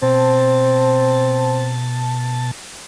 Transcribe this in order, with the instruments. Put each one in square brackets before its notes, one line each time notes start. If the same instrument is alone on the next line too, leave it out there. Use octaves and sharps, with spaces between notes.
[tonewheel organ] B2 A5 [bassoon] C4